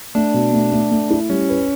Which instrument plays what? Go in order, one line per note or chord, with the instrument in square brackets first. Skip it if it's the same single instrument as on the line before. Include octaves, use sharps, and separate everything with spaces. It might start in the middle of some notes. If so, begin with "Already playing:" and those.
[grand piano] A3 [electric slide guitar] D4
[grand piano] B2
A3
A3
A3
E4
[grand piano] G3 [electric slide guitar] C#4
[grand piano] B4